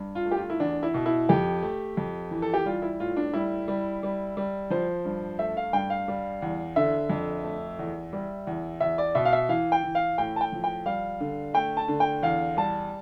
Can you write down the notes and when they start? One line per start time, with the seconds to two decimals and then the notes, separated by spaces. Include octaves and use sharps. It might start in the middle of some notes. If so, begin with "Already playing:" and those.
Already playing: G2
0.15 F4
0.26 A3
0.31 G4
0.37 F4
0.50 E4
0.60 E2 D4
0.83 E4
0.94 B2
1.06 E4
1.29 F2 G4
1.62 A3
1.97 F2
2.31 E3
2.42 A4
2.54 G4
2.65 G3 F4
2.82 E4
3.00 A2 F4
3.16 D4
3.33 G3 E4
3.68 G3
4.03 G3
4.37 G3
4.70 F3 C5
5.05 G2
5.39 A3 E5
5.57 F5
5.73 G2 G5
5.90 F5
6.08 G3
6.42 E2
6.76 D3 E5
7.10 F2
7.44 A3
7.79 E2
8.13 G3
8.47 E2
8.80 E2 E5
8.98 D5
9.15 B2 E5
9.25 F5
9.33 E5
9.49 E3 F5
9.72 G5
9.83 E3
9.95 F5
10.18 A2 G5
10.36 A5
10.41 G5
10.52 F3
10.64 G5
10.86 G3 F5
11.20 D3
11.54 A3 G5
11.77 A5
11.88 D3
12.00 G5
12.22 E2 F5
12.57 G3 A5